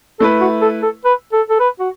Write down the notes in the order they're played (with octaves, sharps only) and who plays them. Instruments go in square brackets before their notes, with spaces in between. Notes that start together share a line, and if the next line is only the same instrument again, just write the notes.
[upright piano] A3 E4 B4 [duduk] A4
[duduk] F#4
A4
A4
B4
A4
A4
B4
F#4